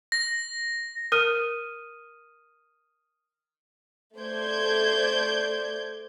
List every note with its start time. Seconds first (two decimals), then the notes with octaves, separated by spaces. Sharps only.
0.12 A#6
1.12 A#4 D#6 F6 D#7
4.19 A3 C5 D5 G6 G#6